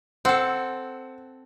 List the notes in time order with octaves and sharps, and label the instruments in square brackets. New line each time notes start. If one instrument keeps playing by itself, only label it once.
[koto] C4 A4 [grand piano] F#5